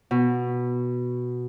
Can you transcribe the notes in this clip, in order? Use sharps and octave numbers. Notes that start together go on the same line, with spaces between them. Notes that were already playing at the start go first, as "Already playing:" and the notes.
B2